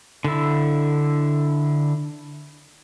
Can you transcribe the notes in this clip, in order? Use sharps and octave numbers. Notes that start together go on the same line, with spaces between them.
D3 E4